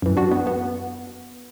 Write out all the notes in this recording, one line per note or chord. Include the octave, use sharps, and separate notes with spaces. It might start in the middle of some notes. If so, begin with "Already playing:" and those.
F#2 E3
D4 F#4
B3
B3